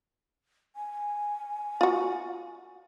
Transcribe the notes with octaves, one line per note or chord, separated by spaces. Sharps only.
G#5
F4 F#4